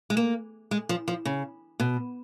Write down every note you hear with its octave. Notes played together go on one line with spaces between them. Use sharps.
G#3
A#3
G#3
F3
F3
C#3
B2